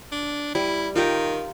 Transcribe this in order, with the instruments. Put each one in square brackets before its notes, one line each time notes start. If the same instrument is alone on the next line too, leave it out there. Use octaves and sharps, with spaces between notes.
[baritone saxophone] D4
[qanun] G3 [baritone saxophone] E4
[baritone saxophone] D#3 [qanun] F4 G4 A#5